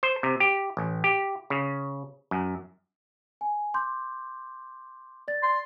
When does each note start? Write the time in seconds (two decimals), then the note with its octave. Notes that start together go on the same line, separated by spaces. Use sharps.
0.03 C5
0.23 C3
0.40 G4
0.77 A1
1.04 G4
1.50 C#3
2.31 F#2
3.41 G#5
3.74 C6 D6 G6
5.28 D5 A6
5.43 C6